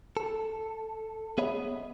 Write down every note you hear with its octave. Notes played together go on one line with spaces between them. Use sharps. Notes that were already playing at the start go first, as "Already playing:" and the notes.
A4
B3 G#4 C#5 D#5 E5 B5